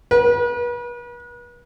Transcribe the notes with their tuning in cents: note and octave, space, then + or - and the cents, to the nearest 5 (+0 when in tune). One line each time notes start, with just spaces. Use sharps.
B4 -40